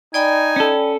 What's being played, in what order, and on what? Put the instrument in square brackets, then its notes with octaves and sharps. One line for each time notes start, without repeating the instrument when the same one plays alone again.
[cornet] D#4 [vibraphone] D5 G5 B5 [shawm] G#5
[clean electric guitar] C#4 A4